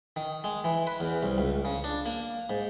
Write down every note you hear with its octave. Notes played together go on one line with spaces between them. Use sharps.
D#3
G#3
E3
B4
E2
C2
C#2
C#3
D4
A#3
G#2